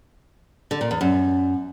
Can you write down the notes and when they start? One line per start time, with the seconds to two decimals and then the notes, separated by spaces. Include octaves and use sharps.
0.71 D3
0.81 A#2
0.91 E2
1.01 F#2